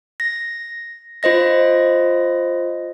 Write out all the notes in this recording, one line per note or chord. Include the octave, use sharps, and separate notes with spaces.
A#6
F4 C5 D#5 A#6